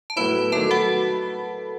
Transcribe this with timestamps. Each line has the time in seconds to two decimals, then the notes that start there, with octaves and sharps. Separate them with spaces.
0.10 A5
0.16 A2 F#3 B3 E4 B4 B5
0.52 D#3 F#3 A3 A4 A5
0.71 F#4 F#5